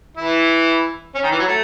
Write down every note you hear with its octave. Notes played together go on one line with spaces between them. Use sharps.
E3 E4
C#4
D#3
E3
F#3
A3